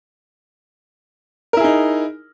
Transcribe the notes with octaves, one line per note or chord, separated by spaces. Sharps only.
D#4 E4 G#4 A#4